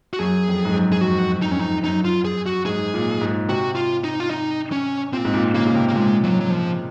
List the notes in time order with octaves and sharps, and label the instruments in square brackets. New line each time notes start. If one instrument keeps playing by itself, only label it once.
[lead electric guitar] F#4
[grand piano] F#2 [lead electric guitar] G#4
[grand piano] F2
G#2
F#2
[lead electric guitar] G#4
[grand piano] F2 [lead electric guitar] F#4
[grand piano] F2 [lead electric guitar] D#4
[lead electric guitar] C#4
D#4
[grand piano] F#2 [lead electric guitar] D#4
[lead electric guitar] F4
G#4
F#4
[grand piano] G#2 [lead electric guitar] G#4
[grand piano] A#2
G#2
[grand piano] C3 [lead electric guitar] F#4
[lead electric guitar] F4
D#4
F4
D#4
C#4
[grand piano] A#2 [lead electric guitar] C4
[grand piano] G#2
A#2
[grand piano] C#3 [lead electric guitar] A#3
[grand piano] C#3
C3
[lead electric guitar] A#3
[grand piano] A#2 [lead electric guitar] G#3
[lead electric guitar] F#3
F#3
F3